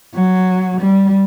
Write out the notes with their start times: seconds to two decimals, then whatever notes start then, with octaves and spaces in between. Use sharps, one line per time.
0.14 F#3
0.81 G3